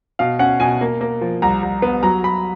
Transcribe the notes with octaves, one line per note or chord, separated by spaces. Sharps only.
B2 F5
C#4 F#5
B2 G#5
A#3
A#3
F3
C2 A#5
C2
B3
F#3 A#5
F#3 B5